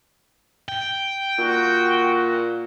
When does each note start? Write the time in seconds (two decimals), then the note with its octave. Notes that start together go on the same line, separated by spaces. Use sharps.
0.69 G5
1.39 A#2 F#4